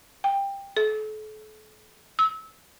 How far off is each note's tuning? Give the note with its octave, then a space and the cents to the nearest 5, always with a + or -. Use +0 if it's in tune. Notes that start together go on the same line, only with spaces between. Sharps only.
G5 +15
A4 -40
E6 -20